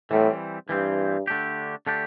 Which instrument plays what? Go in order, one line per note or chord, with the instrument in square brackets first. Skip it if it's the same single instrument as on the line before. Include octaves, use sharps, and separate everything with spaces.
[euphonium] A2 [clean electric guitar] E3 G3 C4
[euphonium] G2 [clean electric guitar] E3 G3 C4
[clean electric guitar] D3 A3 D4 G4
D3 A3 D4 G4